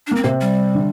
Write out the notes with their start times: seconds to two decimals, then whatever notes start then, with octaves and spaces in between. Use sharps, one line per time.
0.07 D4
0.11 A#3 C4
0.24 C3 A#3 C4
0.41 G3
0.75 D3